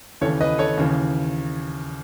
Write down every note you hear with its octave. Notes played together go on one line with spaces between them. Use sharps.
D#2 C#3 E3 A4 C#5
B4 D#5
A4 C#5
D#2 C#3 E3